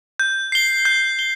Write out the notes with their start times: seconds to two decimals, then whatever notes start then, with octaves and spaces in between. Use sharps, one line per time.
0.20 G6
0.52 C7 G7
0.85 G6
1.19 G7